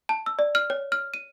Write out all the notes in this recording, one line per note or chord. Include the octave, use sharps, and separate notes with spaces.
A5
E6
D5
F6
C#5
F6
D#7